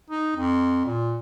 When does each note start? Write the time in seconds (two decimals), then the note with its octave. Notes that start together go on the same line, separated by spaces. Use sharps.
0.10 D#4
0.36 F2
0.85 A#2